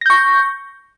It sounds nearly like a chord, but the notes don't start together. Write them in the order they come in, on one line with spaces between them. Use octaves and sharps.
A#6 G6 C#6